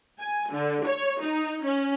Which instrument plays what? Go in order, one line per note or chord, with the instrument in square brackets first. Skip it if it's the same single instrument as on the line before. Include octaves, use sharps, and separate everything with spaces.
[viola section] G#5
D3
C#5
D#4
C#4